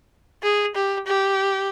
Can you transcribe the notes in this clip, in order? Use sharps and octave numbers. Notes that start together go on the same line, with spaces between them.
G#4
G4
G4